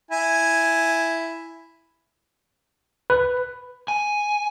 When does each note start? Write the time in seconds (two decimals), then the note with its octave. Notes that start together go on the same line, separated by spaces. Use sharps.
0.11 E4 G#5
3.10 B4
3.88 G#5